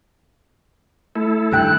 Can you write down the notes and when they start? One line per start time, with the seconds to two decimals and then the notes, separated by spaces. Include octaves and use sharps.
1.16 A3 E4 A4
1.53 G2 D#3 G5 F#6